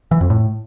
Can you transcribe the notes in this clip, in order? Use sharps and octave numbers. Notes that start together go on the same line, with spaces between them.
E3
F2
A2